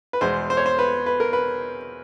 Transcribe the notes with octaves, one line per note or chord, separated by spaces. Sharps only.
B4
E2 B2 G#3 C5
C5
C#5
C5
B4
B4
A#4
B4